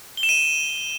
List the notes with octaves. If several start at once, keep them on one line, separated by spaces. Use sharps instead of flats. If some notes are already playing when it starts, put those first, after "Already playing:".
G7
E7
D#7